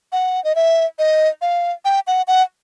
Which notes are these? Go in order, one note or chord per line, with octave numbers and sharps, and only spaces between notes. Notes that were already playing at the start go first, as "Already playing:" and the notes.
F#5
D#5
E5
D#5
F5
G5
F#5
F#5